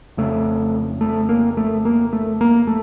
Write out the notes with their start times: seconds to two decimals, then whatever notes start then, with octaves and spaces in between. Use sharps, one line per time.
0.17 F2 C#3 A3
1.01 A3
1.29 A#3
1.57 A3
1.85 A#3
2.13 A3
2.41 A#3
2.67 A3